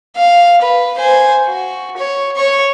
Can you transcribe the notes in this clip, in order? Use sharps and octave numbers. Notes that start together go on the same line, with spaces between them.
F5
B4
C5 G#5
F#4
C#5
C#5 C#6